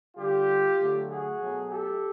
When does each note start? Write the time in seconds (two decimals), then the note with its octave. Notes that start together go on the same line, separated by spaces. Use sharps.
0.16 D3 G3 F4 G4
0.79 D3 F#3 A3
1.08 F#4 G#4
1.39 B2 F#3 A3
1.69 G4 A4